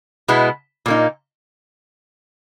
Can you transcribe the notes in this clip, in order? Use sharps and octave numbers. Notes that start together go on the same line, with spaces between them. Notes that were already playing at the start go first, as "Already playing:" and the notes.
B2 G#3 B3 E4
A#2 A#3 D#4